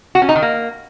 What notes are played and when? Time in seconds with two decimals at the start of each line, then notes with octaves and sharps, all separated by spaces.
0.15 F#4
0.22 C#4
0.29 D#4
0.36 D#3
0.42 A#3